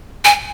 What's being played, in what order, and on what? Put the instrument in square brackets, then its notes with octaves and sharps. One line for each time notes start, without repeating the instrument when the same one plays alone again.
[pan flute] G#5